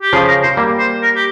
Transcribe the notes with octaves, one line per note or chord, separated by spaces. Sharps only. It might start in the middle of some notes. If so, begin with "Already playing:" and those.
G4
C#3 F3 G#4
A#4
C5
G3 A#3
C5
A#4
G4